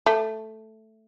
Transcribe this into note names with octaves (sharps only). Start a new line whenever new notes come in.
A3